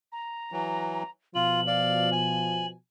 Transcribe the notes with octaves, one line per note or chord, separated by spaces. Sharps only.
A#5
E3 F#3
B2 F3 F4 F#7
D5 F5
G#5